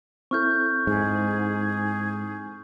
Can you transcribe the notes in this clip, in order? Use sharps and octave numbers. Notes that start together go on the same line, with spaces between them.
C4 E4 A4 C#6 F6 G6
G#2 G#4